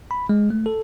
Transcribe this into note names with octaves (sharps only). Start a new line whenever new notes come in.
B5
G#3
A3
A4